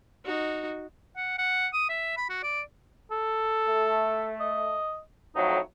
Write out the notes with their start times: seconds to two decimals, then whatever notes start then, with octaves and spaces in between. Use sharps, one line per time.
0.25 D#4 F#4
1.17 F#5
1.38 F#5
1.73 D#6
1.89 E5
2.17 B5
2.29 F#4
2.43 D5
3.11 A4
3.67 A3
4.40 D#5
5.35 F2 A2 F#3 D#4